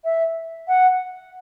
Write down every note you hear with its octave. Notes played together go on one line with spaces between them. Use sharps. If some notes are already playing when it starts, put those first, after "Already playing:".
E5
F#5